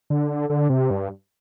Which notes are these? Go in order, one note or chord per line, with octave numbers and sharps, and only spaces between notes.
D3
D3
C3
G2